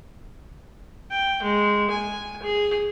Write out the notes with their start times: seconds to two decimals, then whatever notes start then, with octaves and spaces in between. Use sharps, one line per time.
1.10 G5
1.43 G#3
1.90 G#5
2.43 G#4